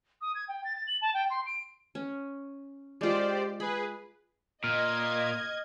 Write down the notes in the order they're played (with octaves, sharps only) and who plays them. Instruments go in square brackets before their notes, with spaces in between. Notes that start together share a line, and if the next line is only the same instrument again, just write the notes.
[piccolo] D#6
G#6
G5
A6
A6
F#7
A5
G5
C6
D7
[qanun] C#4
[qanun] G#3 F4 [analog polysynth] G4 C5 D5
[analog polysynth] G#4 B4 [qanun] B5
[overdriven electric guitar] A#2 [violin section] D#5 G#6 [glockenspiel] F6